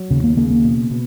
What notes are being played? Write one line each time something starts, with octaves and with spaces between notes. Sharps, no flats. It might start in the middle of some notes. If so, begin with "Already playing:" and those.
Already playing: F#3
D#2 C#3
A#3
C#3 A#3
A#3
B2
B2